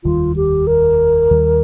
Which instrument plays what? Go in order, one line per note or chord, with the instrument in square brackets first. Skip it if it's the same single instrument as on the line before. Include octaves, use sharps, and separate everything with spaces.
[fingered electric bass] F1 D#2 D#3 G3 [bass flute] F4
[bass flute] G4
A#4
[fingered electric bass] D#2 D#3 G3